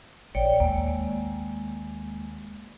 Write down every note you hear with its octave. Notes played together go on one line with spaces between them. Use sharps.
A#1 C#5 D5 G5
D#2 G#3 A#3